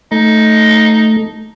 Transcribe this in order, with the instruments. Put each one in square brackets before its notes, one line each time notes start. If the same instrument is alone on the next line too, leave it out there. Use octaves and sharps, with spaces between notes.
[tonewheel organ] A3 [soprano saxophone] D#4